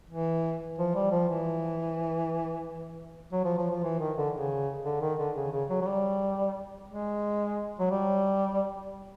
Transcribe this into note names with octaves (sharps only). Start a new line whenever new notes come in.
E3
F3
G3
F3
E3
F#3
F3
F3
F3
E3
D#3
D3
C#3
D3
D#3
D3
C#3
C#3
F#3
F#3
G3
G#3
F#3
G3